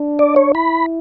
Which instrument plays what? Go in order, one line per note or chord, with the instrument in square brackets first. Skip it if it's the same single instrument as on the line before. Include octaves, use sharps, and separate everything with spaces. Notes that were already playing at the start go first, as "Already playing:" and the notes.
Already playing: [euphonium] D4
[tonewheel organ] D5
C#5
[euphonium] E4 [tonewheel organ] B5